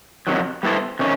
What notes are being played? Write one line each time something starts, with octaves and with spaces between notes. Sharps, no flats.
F2 C3 D#3 F#3
G3 B3 E4 A4 C5
C3 D#3 C#4